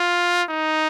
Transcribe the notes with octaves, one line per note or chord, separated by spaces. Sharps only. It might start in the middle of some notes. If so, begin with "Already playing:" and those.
Already playing: F4
D#4